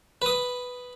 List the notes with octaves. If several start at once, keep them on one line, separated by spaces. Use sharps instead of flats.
B4 D#6